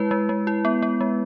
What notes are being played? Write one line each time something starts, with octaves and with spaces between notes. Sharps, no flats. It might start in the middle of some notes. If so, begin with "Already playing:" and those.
Already playing: G#3 E4 B4
G#3
G#3
E4
B3
B3
G#3